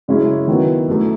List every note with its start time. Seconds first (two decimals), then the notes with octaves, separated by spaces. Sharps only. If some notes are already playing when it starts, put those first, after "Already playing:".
0.08 F#2 C#3 G#3 C#4 E4
0.48 D#3 F#3 B3 E4
0.88 F#2 E3 A3